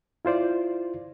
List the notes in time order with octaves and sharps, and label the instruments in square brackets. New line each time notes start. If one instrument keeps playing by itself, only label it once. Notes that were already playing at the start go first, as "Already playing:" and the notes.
[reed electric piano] E4 F4 C5 D5